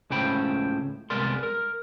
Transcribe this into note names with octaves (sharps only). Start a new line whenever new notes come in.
C#2 A2 C#4 C5 G5 B5
C2 G#3 B3 A#4 D5 C6
A#4